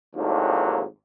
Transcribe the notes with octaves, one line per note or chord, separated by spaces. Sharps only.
G#1 D#2 A2 F3 F#3 D4